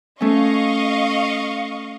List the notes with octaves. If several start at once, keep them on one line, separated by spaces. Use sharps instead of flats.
A3 C#4 D#5 F5 C#6